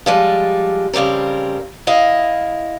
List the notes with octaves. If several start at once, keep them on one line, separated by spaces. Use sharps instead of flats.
F3 G3 G#3
F2 C#3 G3 C4 A#4
E4 D#5 F5